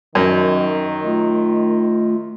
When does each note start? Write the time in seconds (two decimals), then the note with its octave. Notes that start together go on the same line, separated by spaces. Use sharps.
0.15 F#2 D#3
1.04 A3 F4